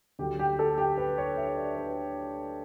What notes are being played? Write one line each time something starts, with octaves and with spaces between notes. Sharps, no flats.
D2 D3 F#3 G4
G4
A4
G4
B4
C#5
E5
D5
B4